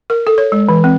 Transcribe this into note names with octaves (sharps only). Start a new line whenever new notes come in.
A#4
A4
C#5
G#3
E3
C4